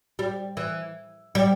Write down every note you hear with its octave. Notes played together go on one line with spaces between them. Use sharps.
G3
E3
G3